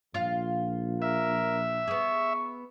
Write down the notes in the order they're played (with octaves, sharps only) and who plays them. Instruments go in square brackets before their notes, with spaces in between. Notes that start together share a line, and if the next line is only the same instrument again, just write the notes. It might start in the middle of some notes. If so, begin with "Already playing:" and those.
[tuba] A#1 [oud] F4 F5
[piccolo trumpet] A#4 [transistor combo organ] E5
[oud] B3 G#4 [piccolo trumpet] C#6